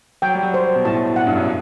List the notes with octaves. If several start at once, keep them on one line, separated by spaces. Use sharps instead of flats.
F#3 G5
G3
F#3
C5
B2
A2 A5
F#5
G2
F#2